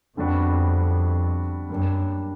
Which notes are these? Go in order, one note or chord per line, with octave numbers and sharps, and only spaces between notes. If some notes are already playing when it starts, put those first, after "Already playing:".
F2 D3 G3 B3 D4 F#4
F#2 G3 A#3 D4